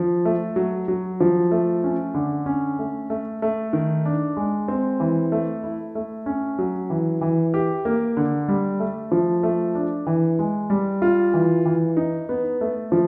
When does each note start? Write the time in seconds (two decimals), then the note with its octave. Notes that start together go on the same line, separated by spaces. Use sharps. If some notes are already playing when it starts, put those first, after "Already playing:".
Already playing: F3
0.25 A3
0.56 F#3
0.88 F#3
1.20 F3
1.51 A3
1.84 C#4
2.14 D3
2.46 C#4
2.79 A3
3.10 A3
3.42 A3
3.73 D#3
4.05 D4
4.37 G#3
4.68 C4
5.00 E3
5.32 A3
5.63 E4
5.95 A3
6.26 C#4
6.59 F#3
6.90 E3
7.21 E3
7.54 G4
7.85 A#3
8.17 D3
8.48 G3
8.80 A3
9.12 F3
9.43 A3
9.75 D4
10.07 E3
10.39 G#3
10.70 G3
11.02 F4
11.34 E3
11.66 E3
11.97 D#4
12.29 B3
12.61 A3
12.92 F3